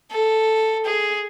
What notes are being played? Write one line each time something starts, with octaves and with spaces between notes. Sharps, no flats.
A4
G#4